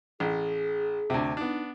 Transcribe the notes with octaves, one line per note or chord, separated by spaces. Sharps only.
A1 G#4
D2 C3
B3 D4 D#4